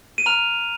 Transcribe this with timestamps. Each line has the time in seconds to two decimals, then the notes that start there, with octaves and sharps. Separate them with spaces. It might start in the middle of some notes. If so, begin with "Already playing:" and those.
0.18 D#7
0.26 A#5 F6 F7